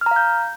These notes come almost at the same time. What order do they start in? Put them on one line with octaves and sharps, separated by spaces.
F6 A#5 F5 G6